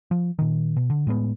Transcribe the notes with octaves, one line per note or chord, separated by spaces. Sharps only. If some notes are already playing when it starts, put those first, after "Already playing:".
F3
A#2 D#3
B2
D3
A2 G#3 A#3 B3